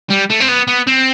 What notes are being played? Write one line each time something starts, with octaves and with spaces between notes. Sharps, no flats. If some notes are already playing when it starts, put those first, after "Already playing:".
G3
A3
C4
B3
B3
C4